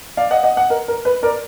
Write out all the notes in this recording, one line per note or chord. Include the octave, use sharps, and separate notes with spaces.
D5 F5
D#5 F#5
D#5 F#5
D#5 F#5
A#4
A#4
B4
A#4 D5